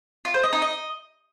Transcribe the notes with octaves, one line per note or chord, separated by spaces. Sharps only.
F4
C5
D#5
D#4
D#5